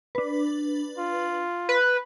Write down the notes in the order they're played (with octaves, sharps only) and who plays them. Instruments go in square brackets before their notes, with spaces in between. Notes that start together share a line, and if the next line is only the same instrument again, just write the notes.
[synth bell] D4 B4
[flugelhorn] F4
[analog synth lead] B4